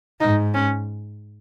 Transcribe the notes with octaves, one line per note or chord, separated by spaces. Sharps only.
G#2 D#4
C#4